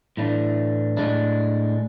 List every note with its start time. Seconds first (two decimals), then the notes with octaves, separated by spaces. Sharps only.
0.17 A2 E3 A3 D4
0.97 A2 G#3 D4